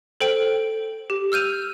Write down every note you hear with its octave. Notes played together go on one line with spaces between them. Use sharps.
A4 C5 G5 D7
G4
E6 F6 G6 D#7 F7